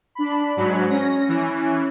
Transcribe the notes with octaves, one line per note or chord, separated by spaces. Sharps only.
D4 B5
G#2 F#3
C#4 A#6
E3